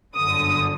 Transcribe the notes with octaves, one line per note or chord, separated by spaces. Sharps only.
G1 F#2 D3 D#6